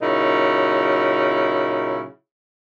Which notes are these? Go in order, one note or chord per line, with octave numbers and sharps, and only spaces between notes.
A#2 C#3 F#3 D#4 E4